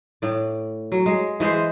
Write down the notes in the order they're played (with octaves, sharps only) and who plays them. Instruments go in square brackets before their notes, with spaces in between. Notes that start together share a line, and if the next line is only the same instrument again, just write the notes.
[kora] A2 D5
F#3
G#3
E3 G#3 C5